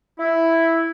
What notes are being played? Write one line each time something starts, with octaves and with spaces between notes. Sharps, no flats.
E4